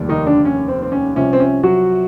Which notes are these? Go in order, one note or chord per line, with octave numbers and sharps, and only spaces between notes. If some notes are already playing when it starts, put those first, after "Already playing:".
Already playing: F1 D#2 G3
D#3 D#4
D3 D4
C#4
C4
C4
C#4
C2 C3 F3 C#4
C4
C#4
F#3 F#4